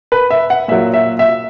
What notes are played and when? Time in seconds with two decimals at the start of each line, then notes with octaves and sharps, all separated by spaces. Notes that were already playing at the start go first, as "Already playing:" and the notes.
0.12 B4
0.30 E5
0.50 F#5
0.68 A#2 F#3 E5
0.94 E5
1.19 E5